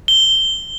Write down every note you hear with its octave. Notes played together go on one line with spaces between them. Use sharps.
G7